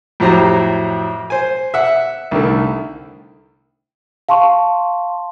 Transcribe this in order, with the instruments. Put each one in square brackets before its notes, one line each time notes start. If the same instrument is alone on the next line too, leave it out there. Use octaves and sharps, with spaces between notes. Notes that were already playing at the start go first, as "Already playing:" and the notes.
[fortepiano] F2 A2 F#3 G4 C5 A#5
C5 G#5
E5 F#5
C2 D3 D#3 A3
[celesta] F5 A5 C6 C#6